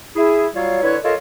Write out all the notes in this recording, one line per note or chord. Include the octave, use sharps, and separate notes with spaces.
E4 G#4
F#3 G3 F4 C#5 F5
D3 E4 B4 C#5
F4 A4 A#4 C#5 D#5